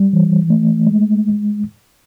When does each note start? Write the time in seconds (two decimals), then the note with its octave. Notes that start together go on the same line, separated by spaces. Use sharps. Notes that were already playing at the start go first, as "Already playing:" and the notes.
Already playing: G3
0.13 E3
0.50 A3
0.87 G#3